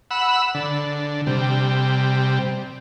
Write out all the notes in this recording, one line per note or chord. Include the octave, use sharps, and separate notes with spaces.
F#5 B5 E6
D3
C3 G3